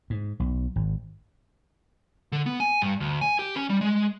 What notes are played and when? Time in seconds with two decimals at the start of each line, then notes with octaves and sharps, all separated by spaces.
0.10 G#2
0.40 B1
0.76 G#1
2.32 D3
2.46 B3
2.60 G#5
2.82 G2
3.00 D2
3.21 G#5
3.39 G4
3.56 C#4
3.70 G3
3.81 G#3